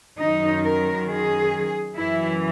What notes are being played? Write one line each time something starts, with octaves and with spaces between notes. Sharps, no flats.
F#2 D#3 D#4
A#4
G#4
F#2 E3 E4